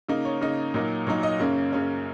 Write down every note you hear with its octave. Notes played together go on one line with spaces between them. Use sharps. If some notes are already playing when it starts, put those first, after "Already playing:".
C#3 A#3 D#4
C#5
C#3 A#3 D#4
A#2 F#3 A#3 D#4
A#2 F#3 A#3 D#4 C#5
D#5
F#2 C#3 A#3 C#4
F#2 C#3 A#3 C#4 C#5